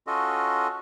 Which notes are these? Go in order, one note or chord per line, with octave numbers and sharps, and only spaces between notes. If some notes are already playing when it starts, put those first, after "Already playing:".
C#4 F4 F#4 A4 D#5